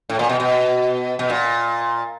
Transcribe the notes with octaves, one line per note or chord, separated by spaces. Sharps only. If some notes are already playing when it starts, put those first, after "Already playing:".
A2
A#2
B2
B2
B2
A#2